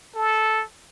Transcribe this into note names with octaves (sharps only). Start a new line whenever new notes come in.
A4